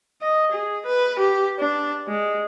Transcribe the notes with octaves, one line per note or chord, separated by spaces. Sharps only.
D#5
G#4
B4
G4
D4
G#3